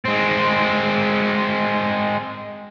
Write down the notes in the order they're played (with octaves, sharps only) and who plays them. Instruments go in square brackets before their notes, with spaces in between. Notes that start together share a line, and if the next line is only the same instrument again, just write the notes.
[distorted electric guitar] G#3 C4